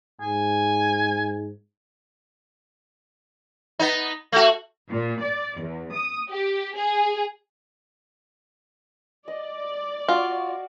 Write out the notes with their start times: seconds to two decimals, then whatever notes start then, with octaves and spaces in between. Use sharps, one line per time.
0.21 G#2 G#5
3.79 B3 D#4
4.32 A3 F#4
4.90 A#2
5.23 D5
5.58 E2
5.93 D#6
6.29 G4
6.76 G#4
9.28 D5 D#5
10.08 F4 F#4 F5 C#6